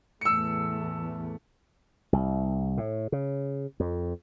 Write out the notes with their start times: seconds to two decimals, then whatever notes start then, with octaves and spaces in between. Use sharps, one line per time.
0.21 E2 A2 A3 E6 C#7
2.13 C2
2.78 A2
3.12 C#3
3.80 F2